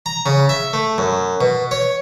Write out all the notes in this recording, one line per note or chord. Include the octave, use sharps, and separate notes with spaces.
A#5
C#3
E5
A3
F#2
B2
C#5